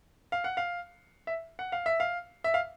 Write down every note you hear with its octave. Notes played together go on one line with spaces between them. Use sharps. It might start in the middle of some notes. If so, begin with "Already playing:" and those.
F5
F#5
F5
E5
F#5
F5
E5
F5
E5
F5